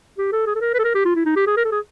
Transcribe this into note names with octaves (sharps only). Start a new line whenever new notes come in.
G4
A4
G#4
A4
A#4
B4
A4
A#4
G4
F4
E4
D#4
G4
G#4
A#4
A4
G#4